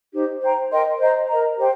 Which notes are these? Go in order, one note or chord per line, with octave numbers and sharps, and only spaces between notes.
D#4 G4 C5
C5 G5 A#5
A#4 D#5 G5 C6
C5 D#5 A#5
A#4 D#5 A#5
G4 C5 G5